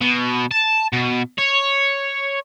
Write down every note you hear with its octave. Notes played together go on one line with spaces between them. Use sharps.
B2
A5
B2
C#5